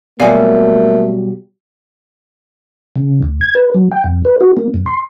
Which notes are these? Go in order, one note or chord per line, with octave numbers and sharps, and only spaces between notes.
B2 F#3 G3 A3 A#3 D5 F5 G#5
C#3
D2
G#6
B4
F#3
G5
F2
B4
F#4
A#3
F#2
C6